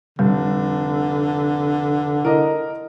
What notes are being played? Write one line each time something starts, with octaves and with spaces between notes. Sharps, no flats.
F1 D3 G3
E4 A#4 D#5